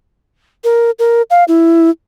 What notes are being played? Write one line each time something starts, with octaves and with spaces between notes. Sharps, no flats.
A#4
A#4
F5
E4